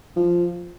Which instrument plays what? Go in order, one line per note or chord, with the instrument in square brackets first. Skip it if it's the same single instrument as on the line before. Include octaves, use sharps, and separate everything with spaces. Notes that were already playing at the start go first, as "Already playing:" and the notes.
[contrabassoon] F3